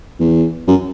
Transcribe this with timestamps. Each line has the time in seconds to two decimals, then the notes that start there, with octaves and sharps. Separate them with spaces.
0.20 E2
0.68 F#2